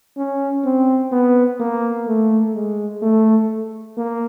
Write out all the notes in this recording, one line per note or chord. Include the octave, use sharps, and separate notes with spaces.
C#4
C4
B3
A#3
A3
G#3
A3
A#3